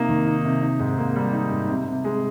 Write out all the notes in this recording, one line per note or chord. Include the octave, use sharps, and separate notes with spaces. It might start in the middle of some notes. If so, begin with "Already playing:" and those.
Already playing: C3 A#3 D#4
D#3
D#4
C3
D#4
G#2
A#3
G3
D#4
G#2
C3
C3
G#3